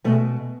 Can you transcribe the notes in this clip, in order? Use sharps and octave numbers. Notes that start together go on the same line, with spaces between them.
B2 G#3 A3